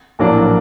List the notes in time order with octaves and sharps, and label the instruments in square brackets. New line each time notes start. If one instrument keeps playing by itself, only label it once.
[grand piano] A#1 A2 F#3 A#3 D4